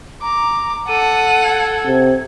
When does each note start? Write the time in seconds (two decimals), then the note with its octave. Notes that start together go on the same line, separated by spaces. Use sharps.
0.22 A#5 D6
0.88 A4 F#5 D#7
1.44 G#6
1.86 C3